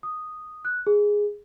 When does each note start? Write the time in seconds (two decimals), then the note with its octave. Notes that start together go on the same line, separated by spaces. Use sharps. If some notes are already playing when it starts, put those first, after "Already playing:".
0.03 D#6
0.65 F#6
0.87 G#4